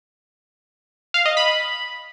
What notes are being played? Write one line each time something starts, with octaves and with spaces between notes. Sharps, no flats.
F5
D#5
B5